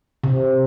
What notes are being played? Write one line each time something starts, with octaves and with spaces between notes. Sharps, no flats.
C3